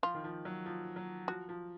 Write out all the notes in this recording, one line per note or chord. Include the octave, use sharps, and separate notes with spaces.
F3 F4
D#3
F3
F#3
F3
F#3
F3 F#4
F3